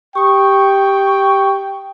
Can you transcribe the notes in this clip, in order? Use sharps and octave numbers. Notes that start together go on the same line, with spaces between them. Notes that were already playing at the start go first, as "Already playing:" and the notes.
G4 G5 C#6 D#6